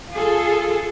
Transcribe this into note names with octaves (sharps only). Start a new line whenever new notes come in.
F4 G#4 A4